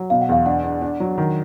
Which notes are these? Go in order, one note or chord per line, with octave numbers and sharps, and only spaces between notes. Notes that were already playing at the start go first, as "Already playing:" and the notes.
Already playing: F#3
B2 F5
F#5
E2 F5
D4 F#5
D4
D4
F#3
D#3